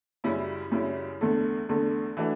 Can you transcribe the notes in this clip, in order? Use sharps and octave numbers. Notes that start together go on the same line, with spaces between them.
F#2 C#3 G3 C#4 E4
F#2 C#3 G3 C#4 E4
E2 D3 A3
E2 D3 A3
E3 A3 D4 F#4